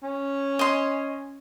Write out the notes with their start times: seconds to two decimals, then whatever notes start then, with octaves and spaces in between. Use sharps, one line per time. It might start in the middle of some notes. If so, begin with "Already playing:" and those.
0.03 C#4
0.59 D#5 C6